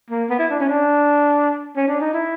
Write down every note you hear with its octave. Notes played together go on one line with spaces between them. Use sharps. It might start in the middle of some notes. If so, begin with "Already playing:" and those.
A#3
B3
E4
D4
C#4
D4
C#4
D4
D#4
E4